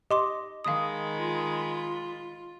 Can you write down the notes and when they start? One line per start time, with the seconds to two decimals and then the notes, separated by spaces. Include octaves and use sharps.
0.11 G4 D#5 C6 D6
0.65 D#3 G#3 F5 B5 D#6
1.16 F4